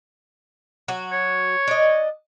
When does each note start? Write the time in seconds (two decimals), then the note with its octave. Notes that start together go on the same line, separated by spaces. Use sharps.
0.88 F#3 F#4
1.12 C#5
1.68 D4 D#5